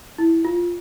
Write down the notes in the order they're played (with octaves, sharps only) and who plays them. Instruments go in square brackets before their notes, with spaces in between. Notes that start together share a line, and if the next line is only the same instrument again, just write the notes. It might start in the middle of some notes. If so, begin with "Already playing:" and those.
[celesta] E4
F4